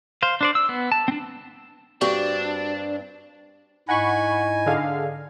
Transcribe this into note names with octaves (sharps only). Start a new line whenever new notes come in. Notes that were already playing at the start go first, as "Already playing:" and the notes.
C5 F5
D4 C5 D5
E6
B3
A5
C4 D4
G2 C4 D4 F#4 G4
G#2 E4 D#5 F#5 G#5 B5 C#6
D3 G#4 F5